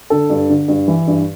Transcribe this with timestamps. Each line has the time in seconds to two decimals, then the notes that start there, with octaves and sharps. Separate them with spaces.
0.10 D3 A4
0.30 G2
0.50 D3
0.68 G2
0.88 E3
1.07 G2